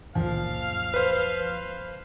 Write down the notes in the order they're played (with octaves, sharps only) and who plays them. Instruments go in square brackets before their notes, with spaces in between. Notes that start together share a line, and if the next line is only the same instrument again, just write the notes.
[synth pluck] C#2 F#2 A#2 [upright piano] F3 [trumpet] F5
[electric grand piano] B4 C5